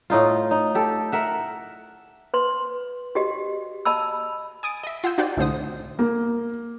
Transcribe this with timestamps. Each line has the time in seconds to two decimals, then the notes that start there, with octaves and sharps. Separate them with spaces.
0.10 A2 D#4 F4
0.51 D#4
0.75 G4 A4
1.12 A#4 E5 F#5
2.34 B4 C6
3.15 F#4 G4 D#5
3.85 D#5 A5 B5 E6
4.63 G#5 D#6 A6 D7
4.84 D#5 E5
5.04 F4 F#5 E6 G6 D#7
5.18 D#4 F#4 G4 C5 D5
5.37 C2 A2 D3 C5 D#6
5.99 A#3